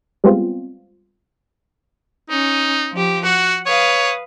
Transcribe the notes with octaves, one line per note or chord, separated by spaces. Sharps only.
G3 G#3 B3 C4 F4
C#4 D#4
F3 G4
F#4 F#5
B4 C#5 F5 D#6